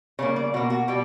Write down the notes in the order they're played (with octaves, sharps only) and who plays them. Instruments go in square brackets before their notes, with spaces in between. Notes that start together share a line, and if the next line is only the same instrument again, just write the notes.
[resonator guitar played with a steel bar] C#3 G3 A#3 C#5
D5
B2 A#3 F#4
F#4
B2 G3 G4